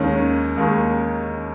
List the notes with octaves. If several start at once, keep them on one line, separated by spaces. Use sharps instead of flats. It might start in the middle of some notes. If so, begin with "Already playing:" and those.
Already playing: D#2 D#3 G#3 C#4
D#2 D#3 G#3